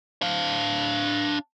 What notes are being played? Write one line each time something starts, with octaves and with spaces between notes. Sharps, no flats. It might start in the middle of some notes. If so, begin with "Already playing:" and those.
D4 F5